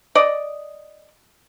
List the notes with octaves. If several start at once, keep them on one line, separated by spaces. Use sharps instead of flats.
D5 D#5